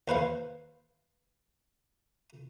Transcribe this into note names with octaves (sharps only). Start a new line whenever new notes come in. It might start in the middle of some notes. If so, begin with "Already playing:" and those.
D#2 B4 C5 F5